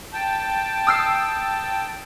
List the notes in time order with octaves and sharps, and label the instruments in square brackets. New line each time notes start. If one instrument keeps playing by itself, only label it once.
[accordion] G5 A5
[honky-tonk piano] D#6 E6 C7